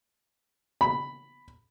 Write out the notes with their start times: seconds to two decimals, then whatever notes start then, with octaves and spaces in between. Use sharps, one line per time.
0.81 B5